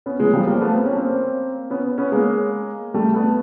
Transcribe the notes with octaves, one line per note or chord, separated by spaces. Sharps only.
B3 C#4
F#3 G#3
F3 G3
A#3 C4
A3 B3
C4
C#4
A#3 C4
B3 C#4
B3 C#4
G#3 A#3
G3 A3
A3 B3